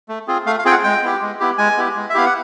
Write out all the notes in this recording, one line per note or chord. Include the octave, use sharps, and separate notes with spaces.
A3
C4 F4 G#4
A3 F5
F5
C4 F4 G#4 G5
F#5
G#3 G5
B3 E4 G4
G#3
B3 E4 G4
G#3 G#5
B3 E4 G4
G#3
E5
B3 E4 G4 F5
F#5